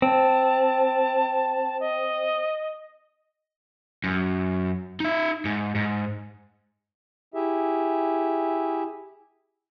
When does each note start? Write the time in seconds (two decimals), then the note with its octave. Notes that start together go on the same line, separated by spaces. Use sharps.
0.02 C4 A5
1.80 D#5
4.04 F#2
5.00 D#4 E5
5.45 G#2
5.75 G#2
7.34 E4 G4 G#4 E5